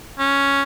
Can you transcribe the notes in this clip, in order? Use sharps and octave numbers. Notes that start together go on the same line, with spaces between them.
C#4